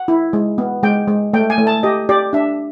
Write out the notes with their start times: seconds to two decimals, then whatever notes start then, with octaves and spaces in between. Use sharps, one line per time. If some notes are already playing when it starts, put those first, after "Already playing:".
Already playing: F#5
0.08 E4
0.33 G#3
0.58 B3
0.83 G#3 G5
1.08 G#3
1.33 A3 G5
1.50 G#5
1.58 A3
1.67 A5
1.83 G4 D#5
2.09 G4 D5
2.33 D4 E5